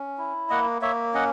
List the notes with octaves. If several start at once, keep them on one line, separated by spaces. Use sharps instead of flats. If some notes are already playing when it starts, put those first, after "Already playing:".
Already playing: C#4
E4
A#3 D#5 F#5
A#3 C#5 E5
C#4 D#5 F#5